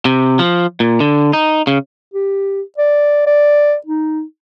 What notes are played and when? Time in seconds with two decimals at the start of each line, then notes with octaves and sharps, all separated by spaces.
0.05 C3
0.39 F3
0.80 A#2
1.00 D3
1.33 D#4
1.67 C#3
2.14 G4
2.78 D5
3.27 D5
3.86 D#4